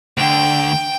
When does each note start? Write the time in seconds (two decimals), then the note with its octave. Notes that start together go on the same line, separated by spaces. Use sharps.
0.18 D2 D3 G5